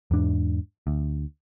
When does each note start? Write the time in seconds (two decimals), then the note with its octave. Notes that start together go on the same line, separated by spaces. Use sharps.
0.11 E2 G#2 D4
0.87 D2